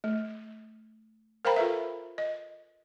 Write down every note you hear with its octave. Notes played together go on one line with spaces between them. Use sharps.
A3
A#4 C5 F5 G5 A#5 B5
F4 A4 B4 E5
D#5